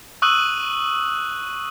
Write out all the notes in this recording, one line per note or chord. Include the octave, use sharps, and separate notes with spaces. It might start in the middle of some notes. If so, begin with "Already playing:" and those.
C#6 D#6 E6 F#6 D#7 F#7